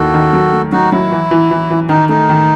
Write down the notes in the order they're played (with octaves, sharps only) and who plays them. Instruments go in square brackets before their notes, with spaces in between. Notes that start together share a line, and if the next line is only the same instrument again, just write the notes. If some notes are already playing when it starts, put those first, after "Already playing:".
Already playing: [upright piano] D#2 D#3 E4 [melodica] F#4 A4
[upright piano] D#3
F#3
A3
[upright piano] F#3 [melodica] D#4 F#4
[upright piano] F#3 [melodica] E4
[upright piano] E3
E3
E3
E3
[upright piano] D#3 [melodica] D#4
[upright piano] A3 [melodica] D#4
[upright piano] D#3